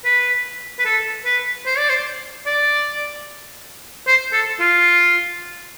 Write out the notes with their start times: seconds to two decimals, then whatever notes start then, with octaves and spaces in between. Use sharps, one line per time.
0.05 B4
0.79 B4
0.86 A4
1.25 B4
1.66 C5
1.78 D5
1.89 C5
2.46 D5
4.07 C5
4.33 A4
4.60 F4